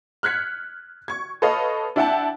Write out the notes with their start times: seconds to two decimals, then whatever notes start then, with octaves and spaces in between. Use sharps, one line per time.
0.23 F6 F#6 G#6 B6 C#7
1.08 C#6 G#6
1.42 A4 B4 C#5 D#5 F5
1.96 D4 E4 E5 F#5 G5 A5